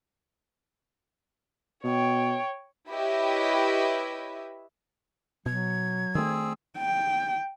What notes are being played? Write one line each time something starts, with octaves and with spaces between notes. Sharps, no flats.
B2 C#5 G5
E4 G4 B4 C#5 D#5 E5
B2 F#3 G#6
D#3 A3 C4 G#4 E6
G5